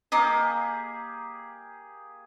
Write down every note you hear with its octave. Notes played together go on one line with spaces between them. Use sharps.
A#3 G4 G#4 D#5 A#5 D6